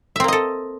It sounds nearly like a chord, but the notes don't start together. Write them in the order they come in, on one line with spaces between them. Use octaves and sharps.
E5 C4 A#3 D#5 A4